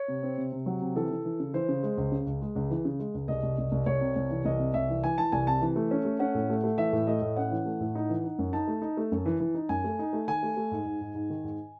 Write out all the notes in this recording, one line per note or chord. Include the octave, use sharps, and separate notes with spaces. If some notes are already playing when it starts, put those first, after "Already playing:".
Already playing: C#5
C3
C4
C3
C3
F#3
C3
E3 A4
E3
E3
C#3
E3 C5
C#3
G#3
C#2
C#3
C#2
G#3
C#2
E3
C#3
G#3
C#2
C2 D#5
C2
C2
C2
C2 C#5
C3
C2
E3
C2 D#5
C3
C2 E5
E3
E3 G#5
E3 A5
C2 G#5
C3 A5
E3
A3
C#4
A3
C#4 F#5
A2
A3
A3
E3 E5
A2
A3 D#5
A2
C#4 F#5
E3
A3
A2
D#4
E3
D#4
F#2
D#4 A5
A3
D#4
A3
F#2
E3
E3
D#4
F#2 G#5
A3
D#4
A3
D#3 G#5
A3
A3
G#2
G#2
G#2
G#2
D#3
G#2